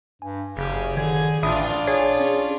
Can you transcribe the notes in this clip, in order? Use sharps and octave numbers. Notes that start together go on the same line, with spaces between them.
G2 G#5
F#1 C#3 G4 G#4
D3 D#3 G#4 D5 G#6
A1 A#2 D4 F4 E5 B5 D#6
G#4 C#5
C#4